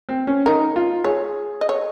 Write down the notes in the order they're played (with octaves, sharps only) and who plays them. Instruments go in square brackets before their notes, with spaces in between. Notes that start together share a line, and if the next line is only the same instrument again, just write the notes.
[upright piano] C4
C#4
[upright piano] D#4 [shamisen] A#4
[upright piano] F4
[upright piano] G#4 [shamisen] C#5
[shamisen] D#5
C#5